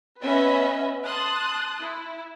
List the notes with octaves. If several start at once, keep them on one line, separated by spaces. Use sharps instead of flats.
B3 C#4 B4 D#5 E5 B5
A5 C6 D#6 F#6
E4